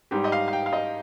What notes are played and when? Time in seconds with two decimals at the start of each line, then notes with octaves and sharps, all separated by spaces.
0.11 G#2 G3 G4
0.24 D#5
0.32 F5
0.48 F5
0.53 G5
0.66 F5
0.73 D#5